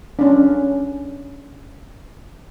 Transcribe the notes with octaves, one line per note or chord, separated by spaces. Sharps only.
C#4 D4